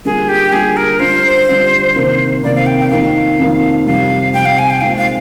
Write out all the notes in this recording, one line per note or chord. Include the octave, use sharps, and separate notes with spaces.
D3 G3 A#3 F4 G#4
G4
D3 G3 A#3 F4 G#4
A#4
D3 G3 D4 F4 C5
D3 G3 D4 F4
C3 D#3 A#3
C3 D#3 A#3 D5
F5
G5
G5
F2 D#3 A#3 D#4 F5
F2 D#3 A#3 D#4
F2 C3 G3 F5
F2 C3 G3 G5
F5
G#5
G5
A#2 G#3 C4 D#4 F5
F5